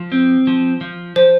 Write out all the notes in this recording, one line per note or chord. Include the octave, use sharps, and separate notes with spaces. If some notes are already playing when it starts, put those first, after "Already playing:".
Already playing: F3
C4
F3
F3
F3 C5